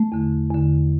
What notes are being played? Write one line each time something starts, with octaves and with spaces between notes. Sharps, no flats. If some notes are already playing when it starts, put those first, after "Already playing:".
Already playing: A3
E2 D3
E2 D3